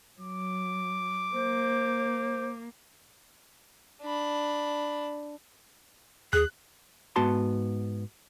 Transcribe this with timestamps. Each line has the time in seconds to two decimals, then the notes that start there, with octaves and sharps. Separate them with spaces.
0.20 F#3 D6
1.33 A#3 C5
4.02 D4 B5
6.33 D#2 G#4 F#6
7.16 G#2 B3 F#4 A5 C6